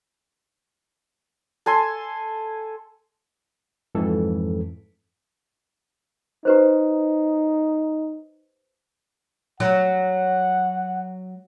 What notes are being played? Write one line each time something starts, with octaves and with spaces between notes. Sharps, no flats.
A4 G#5 C6
F2 G#2 E3 A4
D#4 G4 B4 C5
F#3 F#5